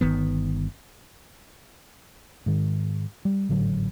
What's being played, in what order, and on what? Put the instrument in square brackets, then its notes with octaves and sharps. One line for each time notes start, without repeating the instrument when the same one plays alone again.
[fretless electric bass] G1 D#3 B3
[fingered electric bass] G#2 D#3
G3
G#1 A2 D3 F#3